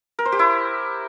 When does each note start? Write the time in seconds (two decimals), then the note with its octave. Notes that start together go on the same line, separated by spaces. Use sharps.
0.19 A#4
0.25 C5
0.32 G4
0.39 E4